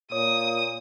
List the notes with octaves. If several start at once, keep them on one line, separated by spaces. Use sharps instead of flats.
A#2 C#5 D#6